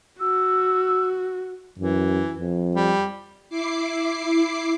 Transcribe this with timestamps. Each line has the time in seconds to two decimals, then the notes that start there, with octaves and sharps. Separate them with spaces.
0.20 F#4 E6
1.78 F#2 E3
2.39 F2
2.75 G3
3.49 E4 D6 C7